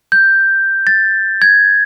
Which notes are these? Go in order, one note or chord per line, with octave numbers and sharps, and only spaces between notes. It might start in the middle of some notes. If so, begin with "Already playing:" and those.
G6
A6
G#6